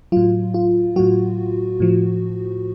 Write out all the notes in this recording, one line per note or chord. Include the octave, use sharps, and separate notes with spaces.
A2 F#3 F4
F4
A2 F#3 F#4
A2 F3